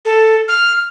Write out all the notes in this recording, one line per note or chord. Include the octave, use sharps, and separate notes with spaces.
A4
F6